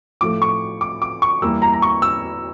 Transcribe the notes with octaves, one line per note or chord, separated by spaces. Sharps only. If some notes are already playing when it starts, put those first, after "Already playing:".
A2 F3 A3 D6
C#6
D6
D6
C#6
E2 E3 G3 A#3 E6
A#5
A#5
C#6
E6